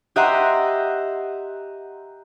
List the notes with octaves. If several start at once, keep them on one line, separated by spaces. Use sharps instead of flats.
G4 D#5 E5 F#5 A#5 C6